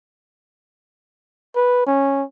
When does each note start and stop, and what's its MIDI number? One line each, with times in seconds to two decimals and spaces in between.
1.55 1.86 71
1.87 2.23 61